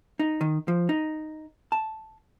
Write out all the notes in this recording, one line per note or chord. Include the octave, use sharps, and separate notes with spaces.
D#4
D#3
F3
D#4
A5